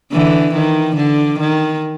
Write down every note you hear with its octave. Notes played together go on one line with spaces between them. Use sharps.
D3 E3
D#3
D3
D#3